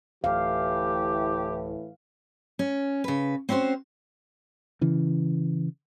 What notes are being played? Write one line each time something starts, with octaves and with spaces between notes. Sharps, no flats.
D1 A2 E3 G4 F5
C#4
C#3 B4
C4 C#4 E4 F#4 C5
C#3 E3